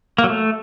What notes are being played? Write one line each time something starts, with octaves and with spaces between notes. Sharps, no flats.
A#3
F#3
A3